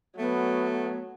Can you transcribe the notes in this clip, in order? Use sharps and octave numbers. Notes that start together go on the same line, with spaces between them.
F#3 A3 B3